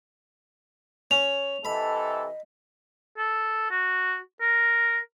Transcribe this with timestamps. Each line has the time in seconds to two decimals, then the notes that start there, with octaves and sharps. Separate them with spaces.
1.11 C#4 F7
1.65 C3 E3 A4 D#5 B5
3.18 A4
3.71 F#4
4.41 A#4